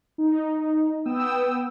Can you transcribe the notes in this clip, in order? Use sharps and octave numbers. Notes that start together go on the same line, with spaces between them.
D#4
B3 G5 D#6 E6